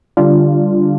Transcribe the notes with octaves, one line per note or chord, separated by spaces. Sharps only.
D3 G3 D4 F4